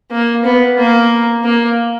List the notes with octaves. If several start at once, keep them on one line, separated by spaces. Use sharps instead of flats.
A#3
B3
A#3
A#3